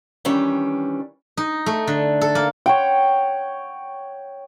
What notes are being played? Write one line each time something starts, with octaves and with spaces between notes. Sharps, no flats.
D#3 E3 G3 C#4 D4
D#4
A3
D3
A4
A#3
C#5 F#5 G5